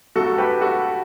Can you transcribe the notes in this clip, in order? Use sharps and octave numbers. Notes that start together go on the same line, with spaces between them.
G2 F#3 A3 F#4 A4
G4 B4
F#4 A4